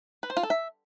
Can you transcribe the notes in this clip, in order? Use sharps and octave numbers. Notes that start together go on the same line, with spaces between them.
B4
C5
F4
A4
E5